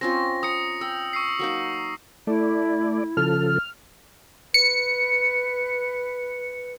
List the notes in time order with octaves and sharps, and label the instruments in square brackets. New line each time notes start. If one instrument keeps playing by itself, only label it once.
[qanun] C4 C#4 F4 [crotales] A#6
[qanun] A#5 [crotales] D#6 C#7
[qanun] G5 [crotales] E6
[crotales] C#6 E6 C7
[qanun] F#3 A#3 D#4
[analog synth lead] A3 [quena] E4 [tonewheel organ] D5
[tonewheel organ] C#3 F3 A4 [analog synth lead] F6
[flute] B4 [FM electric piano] C#7